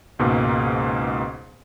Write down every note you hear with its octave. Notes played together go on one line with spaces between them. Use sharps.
C#2 G#2 B2 A#3